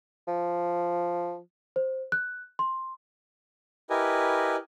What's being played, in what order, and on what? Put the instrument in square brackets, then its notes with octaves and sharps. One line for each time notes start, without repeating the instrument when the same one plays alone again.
[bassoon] F3
[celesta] C5
F#6
C6
[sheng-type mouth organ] E4 G4 A#4 B4 D#5 G#5